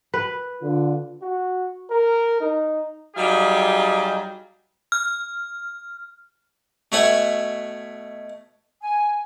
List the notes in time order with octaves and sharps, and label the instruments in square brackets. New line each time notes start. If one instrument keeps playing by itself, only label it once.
[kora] B4
[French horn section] D3 F4
[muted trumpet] F#4
A#4
D#4
[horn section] F#3 G3 D#4 F4 G4 G#4
[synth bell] F6
[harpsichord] B2 A3 C#5 E5 F#5 G#5
[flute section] G#5